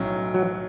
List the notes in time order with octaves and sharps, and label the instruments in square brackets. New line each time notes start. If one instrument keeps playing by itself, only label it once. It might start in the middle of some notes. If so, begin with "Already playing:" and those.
Already playing: [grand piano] B1 A2 F#3 C#4
[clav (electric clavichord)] F#3